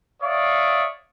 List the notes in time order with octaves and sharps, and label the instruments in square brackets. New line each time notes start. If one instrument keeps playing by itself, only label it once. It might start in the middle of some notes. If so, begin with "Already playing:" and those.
[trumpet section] C#5 D5 E5 F5 D#6